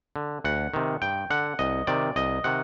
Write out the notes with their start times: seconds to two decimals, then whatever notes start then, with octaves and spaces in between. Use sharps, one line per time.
0.16 D3
0.44 D2 F#5
0.74 C3 D#3
1.02 G2 G5
1.30 D3 F#5
1.59 C2 D#5
1.87 C3 D#3 D5
2.16 C2 D#5
2.44 C3 D#3 F#5